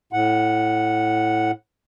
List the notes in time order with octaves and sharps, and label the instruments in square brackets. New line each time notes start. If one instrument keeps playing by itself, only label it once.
[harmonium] A2 F#5